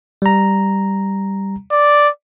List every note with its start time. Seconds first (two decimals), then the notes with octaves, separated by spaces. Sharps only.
0.22 G3 A#5
1.72 D5